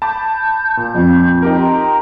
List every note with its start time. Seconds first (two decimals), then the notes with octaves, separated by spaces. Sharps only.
0.02 A5 B5 D6 G6
0.77 A#2 G6
0.94 F2
1.43 D#4 G4 A#4
1.58 G5 A#5 C6